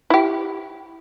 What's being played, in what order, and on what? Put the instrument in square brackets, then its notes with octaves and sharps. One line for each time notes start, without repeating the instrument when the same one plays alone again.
[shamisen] E4 G4